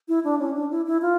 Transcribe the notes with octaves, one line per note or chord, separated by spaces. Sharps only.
E4
D4
C#4
D4
E4
E4
F4